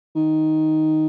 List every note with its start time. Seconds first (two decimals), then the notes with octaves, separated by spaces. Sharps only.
0.15 D#3